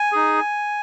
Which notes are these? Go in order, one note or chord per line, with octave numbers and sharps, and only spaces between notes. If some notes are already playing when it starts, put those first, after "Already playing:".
Already playing: G#5
D#4 G#4